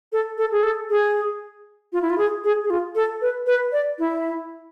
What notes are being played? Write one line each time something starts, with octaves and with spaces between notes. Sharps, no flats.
A4
A4
G#4
A4
G#4
F4
E4
F4
G#4
G#4
G#4
F4
A4
B4
B4
D5
E4